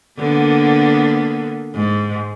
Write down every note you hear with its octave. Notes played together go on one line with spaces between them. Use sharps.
D3 A#3 B3
G#2